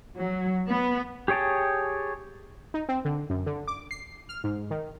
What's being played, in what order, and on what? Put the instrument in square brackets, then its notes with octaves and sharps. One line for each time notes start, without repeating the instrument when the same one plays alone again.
[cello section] F#3
B3
[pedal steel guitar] G4 G#4 C#5 G5 A5
[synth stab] D#4
C4
D3
F#2
D3
D6
C7
F6
G#2
D#3